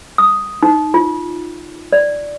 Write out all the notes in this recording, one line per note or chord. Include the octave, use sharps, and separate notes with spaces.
D#6
D#4
F4
D5